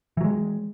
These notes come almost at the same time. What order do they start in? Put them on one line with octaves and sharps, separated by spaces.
E3 F#3 G#3